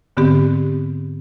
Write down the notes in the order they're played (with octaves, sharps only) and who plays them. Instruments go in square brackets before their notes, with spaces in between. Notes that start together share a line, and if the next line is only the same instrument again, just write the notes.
[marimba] G#2 D3 B3 C4 G4